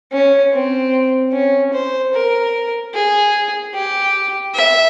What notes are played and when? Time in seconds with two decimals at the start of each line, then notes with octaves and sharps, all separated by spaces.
0.12 C#4
0.53 C4
1.33 C#4
1.73 C5
2.13 A#4
2.94 G#4
3.74 G4
4.54 E5